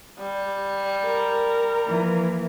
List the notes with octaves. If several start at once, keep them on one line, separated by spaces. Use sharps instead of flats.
G3
A#4
E3 F3 A#3